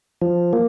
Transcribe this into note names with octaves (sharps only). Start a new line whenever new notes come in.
F3
A#3